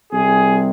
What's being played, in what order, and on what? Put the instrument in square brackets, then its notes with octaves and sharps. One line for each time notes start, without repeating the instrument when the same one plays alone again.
[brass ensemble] C2 C3 G3 G#4